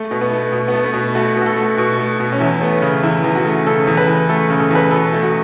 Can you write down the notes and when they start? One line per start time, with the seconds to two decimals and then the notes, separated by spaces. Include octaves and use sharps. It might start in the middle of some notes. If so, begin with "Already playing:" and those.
Already playing: A3
0.11 B2
0.21 B3
0.32 A3
0.52 B2
0.68 B3
0.74 A3
0.84 B3
0.94 B2
1.15 A3 F#4
1.36 B2
1.42 F#4
1.46 A4
1.56 A3
1.77 B2 F#4
1.98 A3
2.20 B2
2.32 C#4
2.40 E2 E4
2.61 A3 B3
2.73 C#4
2.82 C#3
3.03 E2 E4
3.24 E2
3.35 F#4
3.46 A3
3.66 C#3 A4
3.87 E2
3.97 B4
4.08 E2
4.29 A3 A4
4.50 C#3
4.60 A4
4.71 E2 B4
4.91 B2 A4
5.13 A3
5.23 F#4